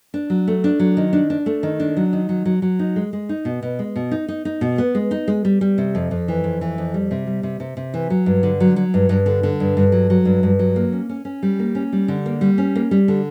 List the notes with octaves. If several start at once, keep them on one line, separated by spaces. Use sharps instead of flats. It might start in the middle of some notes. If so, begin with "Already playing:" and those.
D4
F#3
A3
D4
F#3
D#3
D4
D4
A3
D#3
D4
F#3
D#3
F#3
F#3
F#3
D#4
G#3
G#3
D#4
B2
B2
G#3
B2
D#4
D#4
D#4
B2
B3
G#3
D#4
G#3
G3
G3
C3
F2
F2
E3
F2
E3
F2
G3
C3
G3
C3
C3
C3
E3
F#3
G2
D3
F#3
F#3
G2
G2
D3
D3
G2
G2
F#3
F#3
G2
G2
F#3
A#3
C#4
C#4
C#4
G3
A#3
C#4
G3
D3
A#3
G3
C#4
A#3
G3
D3